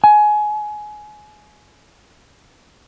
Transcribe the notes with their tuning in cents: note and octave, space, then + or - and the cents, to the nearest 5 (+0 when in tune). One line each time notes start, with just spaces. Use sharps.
G#5 +20